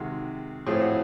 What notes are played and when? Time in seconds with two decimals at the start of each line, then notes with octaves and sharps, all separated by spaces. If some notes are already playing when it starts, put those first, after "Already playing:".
Already playing: C3 D#3 G#3 F#4
0.67 A2 F3 A3 C4 G#4
0.80 F#4